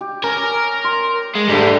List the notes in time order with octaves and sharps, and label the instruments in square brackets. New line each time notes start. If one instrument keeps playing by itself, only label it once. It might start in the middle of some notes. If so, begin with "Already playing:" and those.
[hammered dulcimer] G4
[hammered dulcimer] C#4 [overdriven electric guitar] A#4
[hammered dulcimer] C6
[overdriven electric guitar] G#3
[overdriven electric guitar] G#2 G3 [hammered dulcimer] D3 A3 B4